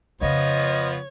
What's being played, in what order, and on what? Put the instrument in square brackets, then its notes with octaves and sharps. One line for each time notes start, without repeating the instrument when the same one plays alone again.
[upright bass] F2 C#3 [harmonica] F3 B3 F4 [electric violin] C#5 [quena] D#5